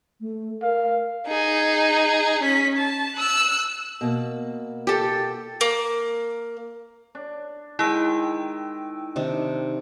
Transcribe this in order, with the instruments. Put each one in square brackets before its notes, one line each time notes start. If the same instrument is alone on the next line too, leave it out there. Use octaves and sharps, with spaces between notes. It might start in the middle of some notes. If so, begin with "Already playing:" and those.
[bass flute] A3
[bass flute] A#4 [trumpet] F5
[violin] D#4 G#4
C#4 B6
A5
E6 F#6
[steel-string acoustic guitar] B2 A#3
[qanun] G4 A4
[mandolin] A#3
[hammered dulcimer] D4
[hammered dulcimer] D#3 G5 [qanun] G#3 F5 [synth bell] E4 E6
[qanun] C3 D#3 D4